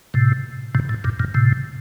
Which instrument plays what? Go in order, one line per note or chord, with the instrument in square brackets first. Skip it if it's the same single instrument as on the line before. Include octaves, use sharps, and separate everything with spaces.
[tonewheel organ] A2 C3
A2 C3
A2
G2 A#2
G2 A#2
A2 C3